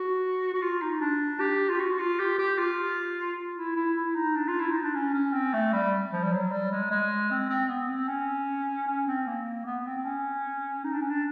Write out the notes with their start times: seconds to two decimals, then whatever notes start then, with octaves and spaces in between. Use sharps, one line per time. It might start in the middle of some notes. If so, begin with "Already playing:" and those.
Already playing: F#4
0.54 F#4
0.62 F4
0.82 D#4
1.01 D4
1.40 G4
1.70 F4
1.80 F#4
1.99 F4
2.20 G4
2.39 G4
2.58 F4
3.57 E4
3.76 E4
3.96 E4
4.15 D#4
4.36 D4
4.48 F4
4.60 E4
4.72 D#4
4.83 D4
4.95 C#4
5.14 C#4
5.34 C4
5.53 A3
5.73 G3
6.13 F3
6.24 G3
6.32 F#3
6.52 G3
6.72 G#3
6.91 G#3
7.31 C4
7.50 C4
7.69 B3
7.89 C4
8.08 C#4
8.87 C#4
9.07 C4
9.27 A#3
9.66 B3
9.86 C4
9.97 C4
10.05 C#4
10.84 D#4
10.93 D4
11.01 C#4
11.09 D4